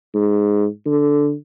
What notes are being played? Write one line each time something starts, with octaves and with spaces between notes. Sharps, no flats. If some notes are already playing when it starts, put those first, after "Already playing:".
G#2
D3